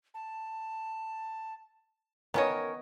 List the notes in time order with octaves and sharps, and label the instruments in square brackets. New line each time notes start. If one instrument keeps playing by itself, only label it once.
[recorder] A5
[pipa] D#3 C#4 C#5 [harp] B3 D#5 [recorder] A#4